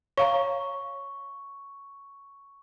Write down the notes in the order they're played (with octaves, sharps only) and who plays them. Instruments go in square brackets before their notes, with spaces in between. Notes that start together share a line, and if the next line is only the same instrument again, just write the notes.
[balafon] C#5 F5 A#5 [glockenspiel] C#6